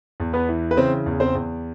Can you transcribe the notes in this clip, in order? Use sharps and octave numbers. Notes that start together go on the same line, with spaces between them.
E2
B3 B4
E3
B4
C#3 C4 C5
E2
C4 C5
E2